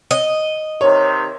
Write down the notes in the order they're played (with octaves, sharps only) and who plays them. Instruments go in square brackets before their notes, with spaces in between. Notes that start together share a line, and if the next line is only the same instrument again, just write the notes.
[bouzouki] D#5
[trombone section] C3 D#3 [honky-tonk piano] C#5